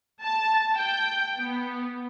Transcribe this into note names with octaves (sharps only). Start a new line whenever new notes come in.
A5
G5
B3